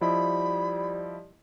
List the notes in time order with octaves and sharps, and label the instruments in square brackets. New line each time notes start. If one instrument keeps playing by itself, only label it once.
[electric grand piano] F3 E4 D#5 [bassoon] G3 [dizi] B5